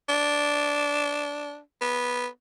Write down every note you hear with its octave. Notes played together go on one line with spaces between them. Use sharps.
D4
B3